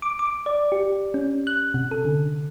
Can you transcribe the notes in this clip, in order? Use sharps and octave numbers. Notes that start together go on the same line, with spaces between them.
D6
D6
D5
G4
C#4
F#6
C3
A4
D3